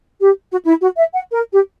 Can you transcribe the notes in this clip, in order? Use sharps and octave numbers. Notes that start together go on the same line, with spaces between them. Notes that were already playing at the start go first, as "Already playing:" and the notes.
G4
F#4
E4
F#4
E5
F#5
A#4
G4